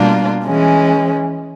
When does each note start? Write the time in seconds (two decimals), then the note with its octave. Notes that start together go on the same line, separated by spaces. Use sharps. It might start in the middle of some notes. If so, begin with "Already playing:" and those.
Already playing: B2 G3 A#3 D4 F4
0.44 E3 G#3 C#4